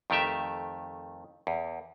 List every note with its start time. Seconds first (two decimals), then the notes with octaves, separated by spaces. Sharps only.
0.10 F2 D#3 A3 G4 E5
1.47 E2